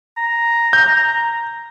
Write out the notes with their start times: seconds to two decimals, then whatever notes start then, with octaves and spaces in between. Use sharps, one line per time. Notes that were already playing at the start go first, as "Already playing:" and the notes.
0.17 A#5
0.73 G6